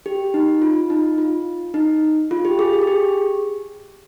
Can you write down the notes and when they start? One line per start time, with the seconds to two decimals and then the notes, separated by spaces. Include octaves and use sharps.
0.06 G4
0.34 D#4
0.62 F4
0.90 D#4
1.18 F4
1.74 D#4
2.31 F4
2.45 G4
2.59 G#4
2.73 G4
2.82 G#4
2.87 G4